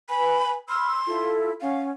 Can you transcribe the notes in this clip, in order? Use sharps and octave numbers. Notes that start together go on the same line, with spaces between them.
B4 G#5 B5
B5 C6 E6 F6
E4 F4 A4
C#4 F5 F#5